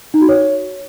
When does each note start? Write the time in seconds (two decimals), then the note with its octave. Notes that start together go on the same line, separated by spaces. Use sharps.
0.14 D#4
0.21 F#4
0.29 C#5